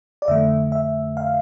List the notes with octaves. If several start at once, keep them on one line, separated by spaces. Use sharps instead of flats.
D5
F2 D3 A3 E5
E5
F5